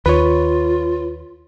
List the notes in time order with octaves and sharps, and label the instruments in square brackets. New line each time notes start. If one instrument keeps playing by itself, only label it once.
[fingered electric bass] D#2 [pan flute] F4 [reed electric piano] B4 C#5